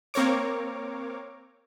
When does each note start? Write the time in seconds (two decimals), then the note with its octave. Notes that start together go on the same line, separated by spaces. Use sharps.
0.14 A#3 C4 A#4 C#5 D6